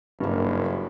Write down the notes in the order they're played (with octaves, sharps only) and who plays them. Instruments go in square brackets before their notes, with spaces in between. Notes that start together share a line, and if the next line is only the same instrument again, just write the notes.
[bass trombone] F#1 [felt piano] G2 A#3